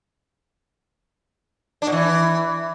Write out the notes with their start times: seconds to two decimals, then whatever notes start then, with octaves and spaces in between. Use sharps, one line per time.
1.82 D4
1.87 B2
1.92 E3